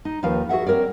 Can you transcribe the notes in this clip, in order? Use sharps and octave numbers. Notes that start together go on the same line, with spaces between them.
D#4
D#2 F3 B4 F5
F#4 G#4 E5 F#5
C4 A#4 C#5 D5